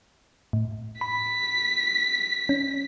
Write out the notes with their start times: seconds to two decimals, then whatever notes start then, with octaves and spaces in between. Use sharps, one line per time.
0.53 A2
1.01 B5 B6
2.49 C#4